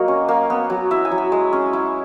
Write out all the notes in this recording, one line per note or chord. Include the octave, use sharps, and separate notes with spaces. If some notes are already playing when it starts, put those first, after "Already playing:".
Already playing: F#3 A#3 F#4 A#4 C#5 D#5
C#4
A#3
B3
F#3
E4 E5
G#5
F#3
B5
G#3
C#4
E4